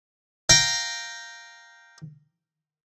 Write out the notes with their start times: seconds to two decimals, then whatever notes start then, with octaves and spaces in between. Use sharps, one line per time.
0.49 F5 G5 A#5